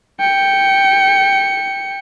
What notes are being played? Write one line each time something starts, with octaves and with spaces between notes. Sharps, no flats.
G5 C#7